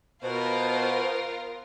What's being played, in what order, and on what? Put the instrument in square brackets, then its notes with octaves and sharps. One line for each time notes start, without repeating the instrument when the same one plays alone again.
[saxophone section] B2 [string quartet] F4 A#4 [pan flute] C5